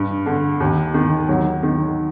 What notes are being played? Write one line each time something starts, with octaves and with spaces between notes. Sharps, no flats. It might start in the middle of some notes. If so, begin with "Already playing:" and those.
Already playing: G2
D3
D#2
D#3
D#2 F#3
D#3